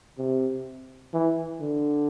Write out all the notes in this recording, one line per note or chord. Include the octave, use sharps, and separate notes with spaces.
C3
E3
D3